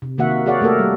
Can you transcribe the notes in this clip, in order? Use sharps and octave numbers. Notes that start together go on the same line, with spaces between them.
C3
C3 D#3 A#3 F#4 E5 F#5
F#4 G#4 C#5 D5 F5 F#5
A3 A#3 G4 A4 A#4
G3